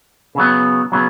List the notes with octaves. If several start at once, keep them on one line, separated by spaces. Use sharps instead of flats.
C#3 F#3 B3
C#3 F#3 B3